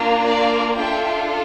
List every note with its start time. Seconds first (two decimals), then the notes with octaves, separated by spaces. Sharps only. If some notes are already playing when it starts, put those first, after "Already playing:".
Already playing: A#3 D4 F4
0.25 D5 F5
0.76 D4 F4 A4 E5 G5